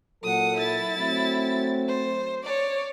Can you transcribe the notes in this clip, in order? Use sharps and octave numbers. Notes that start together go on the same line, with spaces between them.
A#2 F#3 A4 F#5 D#6
E4 A6
F#3 A3 C4
C5
C#5 D5